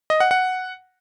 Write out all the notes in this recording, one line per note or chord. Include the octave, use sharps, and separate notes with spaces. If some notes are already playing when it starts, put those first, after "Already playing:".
D#5
F#5
F#5